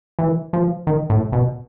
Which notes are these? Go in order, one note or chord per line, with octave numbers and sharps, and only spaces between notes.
E3
F3
D#3
A2
B2